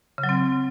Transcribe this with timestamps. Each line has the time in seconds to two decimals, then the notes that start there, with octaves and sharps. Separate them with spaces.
0.18 C#3
0.23 F#3
0.29 C4